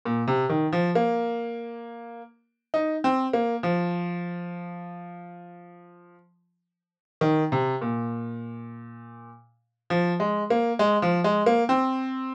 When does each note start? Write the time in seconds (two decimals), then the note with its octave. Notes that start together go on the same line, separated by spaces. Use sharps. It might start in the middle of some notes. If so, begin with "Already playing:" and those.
0.05 A#2
0.27 C3
0.49 D#3
0.72 F3
0.95 A#3
2.74 D#4
3.04 C4
3.33 A#3
3.63 F3
7.21 D#3
7.52 C3
7.81 A#2
9.90 F3
10.20 G#3
10.50 A#3
10.79 G#3
11.02 F3
11.24 G#3
11.46 A#3
11.69 C4